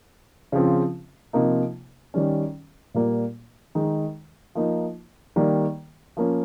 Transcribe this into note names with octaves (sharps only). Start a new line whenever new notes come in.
C#3 F3 C4
C3 F3 A#3 D#4
D#3 G3 C#4
A#2 G3 A#3
D#3 G#3 D#4
F3 A#3 D#4
D#3 G3 A#3
F3 A#3 C#4